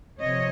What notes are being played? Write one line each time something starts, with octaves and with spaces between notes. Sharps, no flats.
C3 F3 C#5 D#5